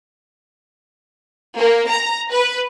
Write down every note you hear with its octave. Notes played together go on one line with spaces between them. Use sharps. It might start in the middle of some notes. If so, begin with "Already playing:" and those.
A#3
A#5
B4